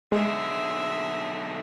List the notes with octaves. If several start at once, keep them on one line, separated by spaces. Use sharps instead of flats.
B1 D3 G#3 G#4 E5